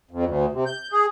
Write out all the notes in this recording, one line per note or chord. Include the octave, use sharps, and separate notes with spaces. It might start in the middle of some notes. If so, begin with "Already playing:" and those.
F2
D2
C3
G6
G#4